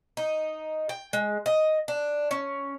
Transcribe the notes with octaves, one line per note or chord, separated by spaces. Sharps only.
D#4
G5
G#3
D#5
D4
C#4